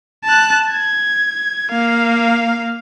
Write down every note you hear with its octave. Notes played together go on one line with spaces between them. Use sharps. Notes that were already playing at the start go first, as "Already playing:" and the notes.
A5 F#6
G#6
A#3 F5